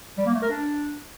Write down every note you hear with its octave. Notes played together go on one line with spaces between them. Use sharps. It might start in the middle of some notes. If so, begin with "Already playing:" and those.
G3
A#3
A3
A#4
D4